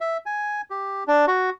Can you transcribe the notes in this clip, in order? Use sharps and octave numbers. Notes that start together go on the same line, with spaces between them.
E5
G#5
G4
D4
F#4